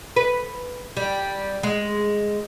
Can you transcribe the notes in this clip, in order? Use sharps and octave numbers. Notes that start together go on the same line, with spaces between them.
B4
G3
G#3